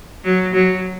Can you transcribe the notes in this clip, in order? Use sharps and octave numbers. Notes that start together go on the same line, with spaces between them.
F#3
F#3